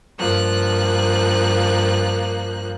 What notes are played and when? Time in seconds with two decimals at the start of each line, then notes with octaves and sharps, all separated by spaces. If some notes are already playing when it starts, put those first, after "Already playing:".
0.18 G2 F3 A#3 F#6